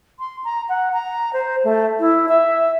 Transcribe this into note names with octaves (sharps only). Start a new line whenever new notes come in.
C6
A#5
F#5
A#5
C5
A3
E4
E5